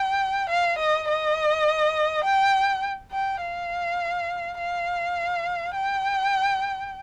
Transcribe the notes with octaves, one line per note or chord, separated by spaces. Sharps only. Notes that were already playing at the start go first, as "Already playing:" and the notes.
Already playing: G5
F5
D#5
D#5
G5
G5
F5
F5
G5